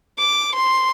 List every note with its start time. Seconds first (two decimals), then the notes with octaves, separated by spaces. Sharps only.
0.19 D6
0.55 C6